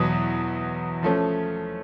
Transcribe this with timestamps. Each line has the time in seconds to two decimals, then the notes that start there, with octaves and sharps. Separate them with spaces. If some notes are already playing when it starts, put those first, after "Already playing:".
Already playing: E2 B2 F#3 B3
1.03 F3 A3 C#4